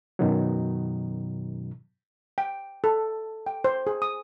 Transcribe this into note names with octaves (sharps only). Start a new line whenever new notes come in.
F#2 B2 D#3 F#3
G5
A4
G5
C5
G#4
D#6